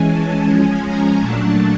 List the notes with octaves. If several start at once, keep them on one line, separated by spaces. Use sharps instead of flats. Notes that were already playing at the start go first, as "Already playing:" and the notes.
Already playing: E3 G#3 C#4 G#5
A5
F3 G#3 C#4 G#5
A#5
A#2 F#3 A3 D4 A5